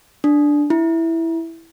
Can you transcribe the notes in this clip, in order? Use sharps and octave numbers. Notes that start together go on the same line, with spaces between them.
D4
E4